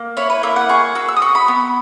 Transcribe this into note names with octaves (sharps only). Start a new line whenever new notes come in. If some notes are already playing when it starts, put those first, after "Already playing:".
Already playing: A#3
E4 C#5
B4
A#3 E5
F#5
G#4 C#6
F#4 E6
E6
D#6
F#4 C#6
B5
B3